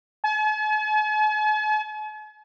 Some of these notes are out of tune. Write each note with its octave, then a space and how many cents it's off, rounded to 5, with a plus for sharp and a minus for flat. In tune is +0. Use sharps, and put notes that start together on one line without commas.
G#5 +45